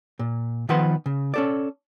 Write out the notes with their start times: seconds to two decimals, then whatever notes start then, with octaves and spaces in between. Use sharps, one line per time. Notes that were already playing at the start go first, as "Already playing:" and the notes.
0.19 A#2
0.69 D#3 F3 B3 B4 F#5 C6
1.06 C#3
1.34 C#4 A4 D5